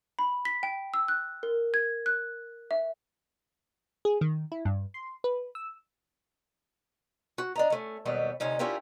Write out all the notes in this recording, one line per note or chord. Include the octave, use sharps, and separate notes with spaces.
B5
B6
G5
E6
F#6
A#4
G#6
F#6
E5
G#4
D#3
E4
G2
C6
B4
E6
F#4
D4 D#5 A#5
A3 C#4
D#2 B2 F#3 G3 B3
D2 C3 C#4 D#4
C#4 D4 E4 F4 G4 A#4